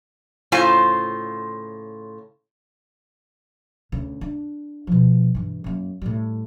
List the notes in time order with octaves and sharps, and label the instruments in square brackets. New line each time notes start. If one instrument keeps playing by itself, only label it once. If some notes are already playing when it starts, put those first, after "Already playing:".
[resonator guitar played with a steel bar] A2 C#3 F4 C5 G#5
[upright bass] D2 C#3
D4
B2 F3
G2 E3
F#2 A#3
A2 G3